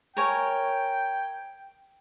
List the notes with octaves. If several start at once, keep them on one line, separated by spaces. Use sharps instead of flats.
A#4 C#5 G5 G#5